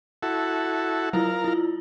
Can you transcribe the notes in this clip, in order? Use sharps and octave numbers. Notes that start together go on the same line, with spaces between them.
E4 F#4 A4
F#3 E4 F4 A#4 F5
E4 F4